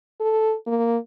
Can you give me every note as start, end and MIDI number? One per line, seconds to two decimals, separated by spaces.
0.20 0.55 69
0.67 0.97 58